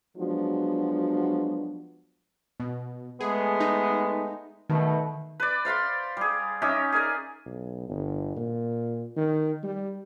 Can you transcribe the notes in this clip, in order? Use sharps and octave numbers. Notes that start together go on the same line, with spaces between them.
F3 F#3 G#3 B3 D4 F#4
B2
G#3 A3 B3 G#4
D#4
B2 D#3 A3
B4 D5
C5 F5 B5 C6
G3 G#4
C#4 D#4 G4 E5
G#4 A#4 D5 G#5
B1
G1
A#2
D#3
G3